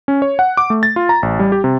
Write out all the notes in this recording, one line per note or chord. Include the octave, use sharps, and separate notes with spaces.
C#4
C#5
F#5
D6
A3
A6
F4
A#5
A1
G3
G4
C3